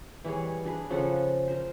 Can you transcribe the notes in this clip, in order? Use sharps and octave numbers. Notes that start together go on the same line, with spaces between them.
E3 G3 G#4 C#5
D4 G#4 B4
C#3 F3 A4 F#5
A#4 C5